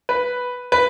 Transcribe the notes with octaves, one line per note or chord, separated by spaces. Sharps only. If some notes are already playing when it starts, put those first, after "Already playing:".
B4
B4